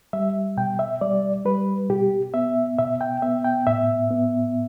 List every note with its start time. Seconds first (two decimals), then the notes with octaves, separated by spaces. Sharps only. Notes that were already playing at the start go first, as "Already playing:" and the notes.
0.13 G3 E5
0.57 B2 G5
0.79 E5
1.01 G3 D5
1.45 G3 B4
1.90 B2 G4
2.34 B3 E5
2.78 B2 E5
3.01 G5
3.22 B3 E5
3.44 G5
3.67 A2 E5
4.11 B3